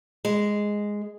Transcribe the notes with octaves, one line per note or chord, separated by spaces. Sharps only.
G#3